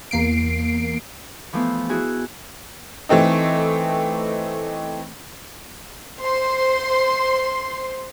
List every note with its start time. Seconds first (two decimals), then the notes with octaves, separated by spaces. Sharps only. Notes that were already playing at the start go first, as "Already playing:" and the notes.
0.11 E2 A#3 C7 D7
1.53 E3 F3 A3 B3 E4
1.89 E4 F#4 G#4
3.09 E3 A3 C4 D#4
6.20 C5 C6